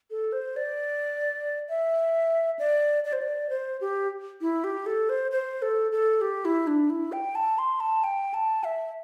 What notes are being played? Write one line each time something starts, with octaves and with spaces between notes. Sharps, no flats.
A4
C5
D5
E5
D5
D5
C5
D5
C5
G4
E4
G4
A4
C5
C5
A4
A4
G4
E4
D4
E4
G5
A5
C6
A5
G5
A5
E5